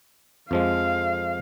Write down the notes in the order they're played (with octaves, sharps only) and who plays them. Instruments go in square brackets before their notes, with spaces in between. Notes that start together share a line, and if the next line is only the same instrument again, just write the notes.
[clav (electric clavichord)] F2 F3 G#3 [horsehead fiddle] F5